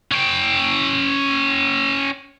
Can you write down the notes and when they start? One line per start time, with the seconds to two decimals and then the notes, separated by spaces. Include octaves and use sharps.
0.12 C#4 G5